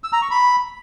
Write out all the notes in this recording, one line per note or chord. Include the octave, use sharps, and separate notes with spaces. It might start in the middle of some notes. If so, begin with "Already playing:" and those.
E6
A#5
C#6
B5